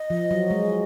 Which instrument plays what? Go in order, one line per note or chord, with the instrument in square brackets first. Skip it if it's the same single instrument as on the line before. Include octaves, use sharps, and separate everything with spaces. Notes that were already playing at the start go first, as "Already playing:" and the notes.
Already playing: [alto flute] D#5
[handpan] F3
F#3
G#3